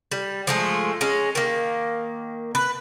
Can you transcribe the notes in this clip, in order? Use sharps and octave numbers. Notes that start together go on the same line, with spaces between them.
G3
F3 G#3 A3
G#3 C#4
D#3 A#3
B4